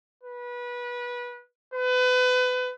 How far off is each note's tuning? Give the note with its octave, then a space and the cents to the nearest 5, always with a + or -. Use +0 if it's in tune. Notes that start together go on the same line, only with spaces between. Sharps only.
B4 -25
B4 +30